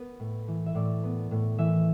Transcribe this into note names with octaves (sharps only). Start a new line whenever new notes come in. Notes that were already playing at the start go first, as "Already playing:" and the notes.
Already playing: B3 B4
A2
E3
E5
A2 D5
B3
A2
E3 E5